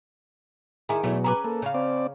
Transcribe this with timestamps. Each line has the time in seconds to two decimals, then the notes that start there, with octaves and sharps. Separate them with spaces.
0.89 D#3 E4 G#4 G#5 A#5
1.03 E2 B2 F#3 A3 E4
1.24 C#4 G#4 B4 A#5 D6
1.44 A#3 A4 A#5
1.62 C#3 F5
1.74 C4 D5